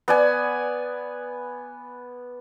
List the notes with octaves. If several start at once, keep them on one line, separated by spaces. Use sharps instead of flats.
B3 D5 G#5